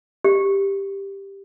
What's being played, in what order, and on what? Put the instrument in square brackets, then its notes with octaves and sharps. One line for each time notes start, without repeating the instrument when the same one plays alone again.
[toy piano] G4